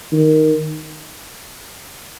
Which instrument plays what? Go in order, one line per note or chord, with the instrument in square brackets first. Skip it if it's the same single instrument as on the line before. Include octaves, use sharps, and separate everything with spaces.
[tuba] D#3